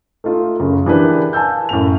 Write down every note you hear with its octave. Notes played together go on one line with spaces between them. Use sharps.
A3 D#4 F4
F#2 C#3
E3 D4 G4 G#4 A#4 B4
F5 G#5 A5 E6 G6
F#2 A2 F7